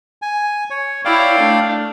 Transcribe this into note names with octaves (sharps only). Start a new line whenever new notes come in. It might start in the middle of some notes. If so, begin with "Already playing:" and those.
G#5
C#5
E4 C#5 D5 F5 G5
A3 D4